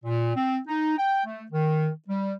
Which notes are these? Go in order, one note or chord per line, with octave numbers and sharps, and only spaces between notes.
A#2
C4
D#4
G5
A3
D#3
G3